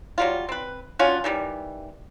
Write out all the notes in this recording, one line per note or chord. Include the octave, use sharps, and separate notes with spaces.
F#3 G3 F4
C4 B4
C#4 D4 F4 F#4
D#3 E3 G3